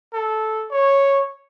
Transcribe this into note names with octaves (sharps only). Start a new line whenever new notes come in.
A4
C#5